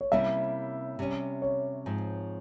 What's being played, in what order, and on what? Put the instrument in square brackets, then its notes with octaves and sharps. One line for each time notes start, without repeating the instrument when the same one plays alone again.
[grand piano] C#5
[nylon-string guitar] C3 G3 A#3 C#4 E4 [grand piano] E5
[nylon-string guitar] C3 G3 C#4
[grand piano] C#5
[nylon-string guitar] G#2 F3 C4